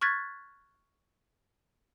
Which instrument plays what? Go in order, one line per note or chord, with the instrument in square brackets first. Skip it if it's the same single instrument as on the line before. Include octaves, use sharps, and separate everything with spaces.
[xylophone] C#6 F6 F#6 G#6 A6 B6